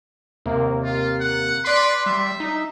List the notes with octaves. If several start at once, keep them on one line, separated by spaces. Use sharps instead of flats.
D#2 C3 A#3
F4
F#5
B4 D5 C6
G3 E5
D#4